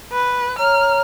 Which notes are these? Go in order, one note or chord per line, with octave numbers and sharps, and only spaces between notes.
B4
C#5 A#5 F6